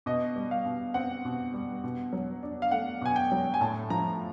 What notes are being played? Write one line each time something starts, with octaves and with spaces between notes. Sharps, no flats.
B2 D#5
G3
F5
B2
C4 F#5
B2
G3
B2
F#3
D4
F5
A3 F#5
B2 G#5
G5
F#3
G#5
A2 A5
F3 A#5